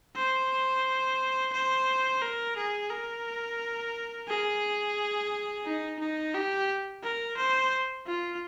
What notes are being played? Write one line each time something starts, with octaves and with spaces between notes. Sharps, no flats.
C5
C5
A#4
G#4
A#4
G#4
D#4
D#4
G4
A#4
C5
F4